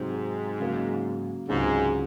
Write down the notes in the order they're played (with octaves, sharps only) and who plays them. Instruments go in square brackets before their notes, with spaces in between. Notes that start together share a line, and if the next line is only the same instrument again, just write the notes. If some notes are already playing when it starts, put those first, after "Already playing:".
Already playing: [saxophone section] G#2 [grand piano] C3 F#3 C4
[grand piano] C#3 F#3 A#3
[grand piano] C#2 C3 F#3 C#4 G#4 [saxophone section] G#2